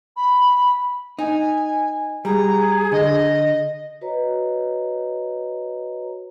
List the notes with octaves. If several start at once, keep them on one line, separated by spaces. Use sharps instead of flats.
B5
D#4 G#5
G3 G#4 A#5
D3 D#5
F#4 B4 C#5 D#5 A#5